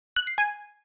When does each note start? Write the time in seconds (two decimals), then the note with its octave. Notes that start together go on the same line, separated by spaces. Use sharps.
0.16 F#6
0.27 C7
0.38 G#5